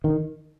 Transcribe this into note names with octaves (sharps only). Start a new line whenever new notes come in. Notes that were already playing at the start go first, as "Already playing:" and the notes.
D#3